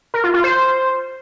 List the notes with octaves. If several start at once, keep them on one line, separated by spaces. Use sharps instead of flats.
A#4
F4
F4
C5